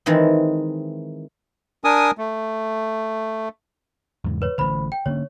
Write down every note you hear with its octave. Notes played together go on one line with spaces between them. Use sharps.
D#3 E3 G#3 C4
D4 A#4 G#5 D#6
A3
E2 G#2 C#3
B4 C#5
A1 D3 C5 B5
G5
D3 A#3 C#4 C#5